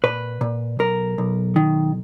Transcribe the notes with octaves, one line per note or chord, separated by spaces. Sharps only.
A#2 B4
A#2
B1 A#4
B1
D#3